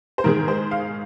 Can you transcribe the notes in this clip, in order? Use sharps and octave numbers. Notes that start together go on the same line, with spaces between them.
C5
G#2 D#3 G#3 A#4
C5
F5